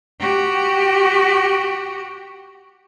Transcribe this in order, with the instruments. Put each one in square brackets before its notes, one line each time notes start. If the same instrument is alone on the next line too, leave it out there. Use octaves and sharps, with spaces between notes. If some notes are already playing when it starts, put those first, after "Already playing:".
[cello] F#4 G4